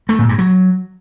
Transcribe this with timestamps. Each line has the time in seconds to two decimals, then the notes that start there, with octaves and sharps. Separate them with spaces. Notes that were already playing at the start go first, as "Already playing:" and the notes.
0.09 A3
0.19 A#2
0.29 G2
0.38 F#3